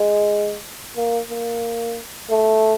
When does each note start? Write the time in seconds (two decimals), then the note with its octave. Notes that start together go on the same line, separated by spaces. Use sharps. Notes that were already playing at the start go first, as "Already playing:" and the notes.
Already playing: G#3
0.97 A#3
1.30 A#3
2.30 A3